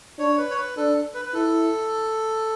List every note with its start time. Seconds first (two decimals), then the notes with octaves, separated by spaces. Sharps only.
0.19 D4 C#5
0.38 B4
0.50 C#5
0.57 B4
0.77 D4 A4
1.14 B4
1.25 B4
1.34 E4 A4